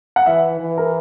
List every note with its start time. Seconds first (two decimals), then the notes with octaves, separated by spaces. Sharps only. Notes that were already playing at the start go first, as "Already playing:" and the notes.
0.16 F#5
0.26 E3 E5
0.60 E3
0.78 A#4